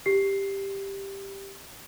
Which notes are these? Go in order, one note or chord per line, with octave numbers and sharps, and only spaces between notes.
G4 C7